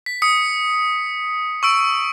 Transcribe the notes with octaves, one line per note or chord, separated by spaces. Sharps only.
B6
D#6 C#7
C#6 E6 D7